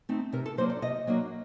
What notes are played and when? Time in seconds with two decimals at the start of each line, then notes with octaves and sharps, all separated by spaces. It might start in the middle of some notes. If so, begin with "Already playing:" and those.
0.09 A3 C4 D#4
0.33 C3 A#4
0.46 A4
0.58 F#3 A#3 D4 C5
0.70 D5
0.82 C3 D#5
1.07 F#3 A#3 D4